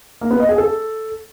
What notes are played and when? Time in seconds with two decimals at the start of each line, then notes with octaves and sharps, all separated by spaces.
0.21 A#3
0.31 B3
0.40 D#5
0.49 G#4
0.58 A4